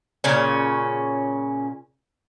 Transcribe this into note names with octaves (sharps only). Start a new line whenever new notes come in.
A#2 C#3 C#4